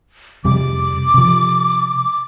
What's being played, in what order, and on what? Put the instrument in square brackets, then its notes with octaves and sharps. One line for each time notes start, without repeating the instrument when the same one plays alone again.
[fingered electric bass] F2 C3 G3 [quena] D6
[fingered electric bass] C3 F3